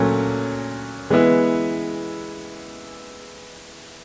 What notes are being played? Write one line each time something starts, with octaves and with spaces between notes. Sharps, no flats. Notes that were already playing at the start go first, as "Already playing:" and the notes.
Already playing: A#2 F#3 A3 C#4
E3 G#3 B3 E4